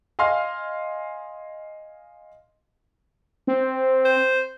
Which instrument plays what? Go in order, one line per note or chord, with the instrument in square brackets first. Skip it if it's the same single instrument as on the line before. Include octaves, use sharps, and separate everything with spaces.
[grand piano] D#5 F5 G#5 C6 F6
[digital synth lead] C4
[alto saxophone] C5